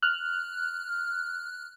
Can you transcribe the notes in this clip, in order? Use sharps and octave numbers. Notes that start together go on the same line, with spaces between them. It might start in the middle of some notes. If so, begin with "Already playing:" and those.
F6 F#6